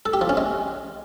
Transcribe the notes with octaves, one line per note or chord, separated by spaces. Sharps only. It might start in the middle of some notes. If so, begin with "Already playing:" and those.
A4
G4
F3
C#4
G#3